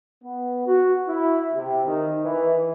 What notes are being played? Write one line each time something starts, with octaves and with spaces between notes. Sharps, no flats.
B3
F#4
E4
C3
D#3
E3